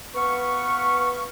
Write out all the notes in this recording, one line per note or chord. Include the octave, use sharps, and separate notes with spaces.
B3 B4 F5 C#6